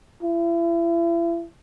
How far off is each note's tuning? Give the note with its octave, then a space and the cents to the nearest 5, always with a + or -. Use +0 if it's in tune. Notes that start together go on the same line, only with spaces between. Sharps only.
E4 +40